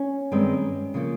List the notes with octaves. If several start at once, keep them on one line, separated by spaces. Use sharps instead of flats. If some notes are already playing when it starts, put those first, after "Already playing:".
Already playing: C#4
G2 D#3 G#3 C4
C#3 F3 A#3